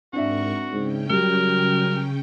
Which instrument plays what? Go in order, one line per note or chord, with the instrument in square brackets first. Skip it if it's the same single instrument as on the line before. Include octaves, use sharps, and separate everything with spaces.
[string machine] G#2 A#4 C#6 [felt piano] C4 D4 E5 [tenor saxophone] F#4
[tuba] G#2 [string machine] C#3 C#4 G5
[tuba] F#3 [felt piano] G3 [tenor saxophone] A#4